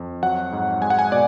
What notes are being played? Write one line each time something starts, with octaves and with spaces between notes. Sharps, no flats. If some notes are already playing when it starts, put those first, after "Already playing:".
Already playing: F2
F#3 F#5
G#2
G#3 G#5
F#5
G#5
B2 D5